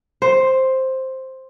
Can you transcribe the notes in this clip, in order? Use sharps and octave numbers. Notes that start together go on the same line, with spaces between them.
C5